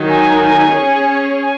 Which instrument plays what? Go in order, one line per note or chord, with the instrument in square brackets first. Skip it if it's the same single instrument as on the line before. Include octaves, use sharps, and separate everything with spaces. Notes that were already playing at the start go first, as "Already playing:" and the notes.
Already playing: [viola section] D#3 F#3 D#4
[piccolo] G#5
[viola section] C#4 G#4 C#5
[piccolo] G#5